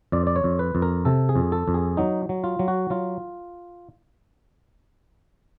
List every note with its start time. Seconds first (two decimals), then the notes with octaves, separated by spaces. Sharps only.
0.12 F2 D5
0.27 D5
0.36 C#5
0.44 F2
0.59 B4
0.75 F2
0.82 A#4
1.05 C3 A4
1.29 G#4
1.36 F2
1.52 A4
1.68 F2
1.74 G#4
1.97 F#3 D#4
2.29 F#3
2.44 F4
2.59 F#3
2.68 F#4
2.90 F#3 F4